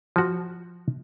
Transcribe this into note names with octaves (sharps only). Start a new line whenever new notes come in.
F3 F#4